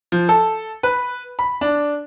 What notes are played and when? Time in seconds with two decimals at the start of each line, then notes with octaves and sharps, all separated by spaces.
0.12 F3
0.29 A4
0.83 B4
1.39 B5
1.61 D4